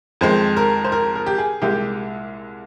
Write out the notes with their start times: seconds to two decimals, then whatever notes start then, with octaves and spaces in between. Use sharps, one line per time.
0.21 F2 D#3 G#3 C5
0.57 A#4
0.84 C5
0.92 A#4
1.15 A#4
1.26 G4
1.38 G#4
1.62 C2 A#2 G#3 G4